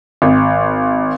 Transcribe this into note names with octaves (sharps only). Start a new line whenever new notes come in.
G#1